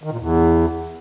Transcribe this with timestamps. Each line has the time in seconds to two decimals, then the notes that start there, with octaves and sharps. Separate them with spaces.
0.04 D#3
0.12 A#2
0.20 E2